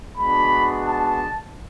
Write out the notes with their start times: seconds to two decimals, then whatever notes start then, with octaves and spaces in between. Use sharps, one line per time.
0.15 G#3 B3 D4 F#4 B5
0.84 A5